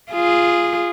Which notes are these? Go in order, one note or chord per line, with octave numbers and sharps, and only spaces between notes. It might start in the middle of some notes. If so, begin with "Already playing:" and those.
F4 G#4